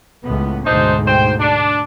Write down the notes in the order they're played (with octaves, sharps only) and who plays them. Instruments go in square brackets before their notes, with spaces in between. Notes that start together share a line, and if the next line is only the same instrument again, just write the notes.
[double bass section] C#2 A2 B3
[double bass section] D2 G#2 B2 [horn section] D4 D#4 C5
[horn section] C5 G5
D4